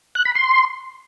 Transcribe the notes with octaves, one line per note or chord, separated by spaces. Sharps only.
F#6
B5
C6